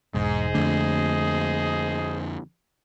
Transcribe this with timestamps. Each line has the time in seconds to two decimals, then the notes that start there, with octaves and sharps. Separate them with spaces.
0.14 E1 G#2 G#4 C5 D#5
0.54 F2 D3 A3